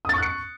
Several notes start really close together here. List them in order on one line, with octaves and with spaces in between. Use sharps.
D#6 A6 C#6 F#6 C#7